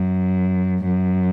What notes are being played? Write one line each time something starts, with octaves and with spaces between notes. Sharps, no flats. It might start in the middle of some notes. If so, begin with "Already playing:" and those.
Already playing: F#2
F#2